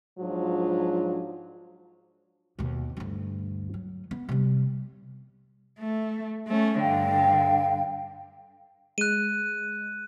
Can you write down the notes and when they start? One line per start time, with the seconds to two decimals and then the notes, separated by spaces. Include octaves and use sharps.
0.19 G#2 F3 F#3 D4 F4
2.59 D#2 B2
2.97 D2 G2
3.74 F#3
4.11 B3
4.29 C3 G3
5.79 A3
6.48 A3 C#4
6.80 G2 D3 F5 G5
8.98 G#3 F#6 D#7